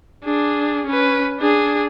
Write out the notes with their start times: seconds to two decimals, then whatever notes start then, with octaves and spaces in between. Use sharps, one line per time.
0.24 D4 G#4
0.86 C#4 B4
1.40 D4 G#4